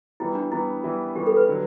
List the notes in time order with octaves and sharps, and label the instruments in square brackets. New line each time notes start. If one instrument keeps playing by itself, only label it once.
[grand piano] E3 G3 B3 [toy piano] E4
[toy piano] D4
[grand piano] E3 G3 B3 [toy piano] E4
[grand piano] E3 G3 B3
[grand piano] E3 G3 B3 [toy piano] G4
[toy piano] A4
B4
[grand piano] D3 F#3